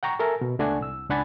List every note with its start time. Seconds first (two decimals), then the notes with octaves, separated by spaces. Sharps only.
0.03 F#5 G5 A#5 C#6
0.19 A4 A#4 E5 G#5
0.41 B2
0.59 C#2 A3 D4 F#5 G#5
0.81 C2 E6
1.10 C#2 D4 F#5 G#5 B5 A6